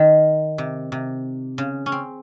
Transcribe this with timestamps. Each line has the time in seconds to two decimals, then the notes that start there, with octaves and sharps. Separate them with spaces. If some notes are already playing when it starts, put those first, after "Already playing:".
Already playing: D#3
0.58 C3
0.92 C3
1.58 C#3
1.86 C#4
1.92 C4